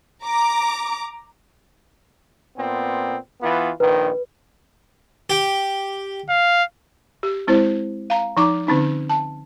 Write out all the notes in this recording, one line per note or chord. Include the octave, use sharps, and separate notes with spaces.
A#5 D6
A#2 B3 C4
E3 B3 F4
A#1 D#3 B4
G4
F5
G4
G#3 C4 E4 C5
F5 A#5
F3 D#4 A#5 D6
D3 C4 C#4 D#4
A5